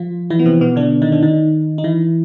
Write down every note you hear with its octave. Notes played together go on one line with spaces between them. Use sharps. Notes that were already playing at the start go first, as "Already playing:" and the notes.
Already playing: F3 F4
E3 E4
B3
C3 C4
B2 B3
D3 D4
D#3 D#4
D3 D4
D#3 D#4
D#4
E3 E4